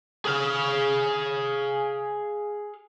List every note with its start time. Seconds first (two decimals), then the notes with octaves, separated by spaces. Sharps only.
0.25 G#4 F5